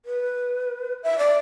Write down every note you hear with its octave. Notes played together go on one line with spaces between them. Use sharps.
B4
E5
D5